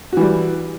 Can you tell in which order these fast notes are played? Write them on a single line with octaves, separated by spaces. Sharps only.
F#4 E3 G3